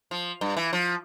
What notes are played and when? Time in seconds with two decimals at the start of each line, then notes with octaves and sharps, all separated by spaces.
0.11 F3
0.41 G2
0.57 E3
0.73 F3